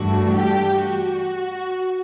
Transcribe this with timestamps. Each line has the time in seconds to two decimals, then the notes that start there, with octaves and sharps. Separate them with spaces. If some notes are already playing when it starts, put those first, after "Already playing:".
Already playing: G2 E3 A3 D4 F#4
0.35 G4
0.82 F#4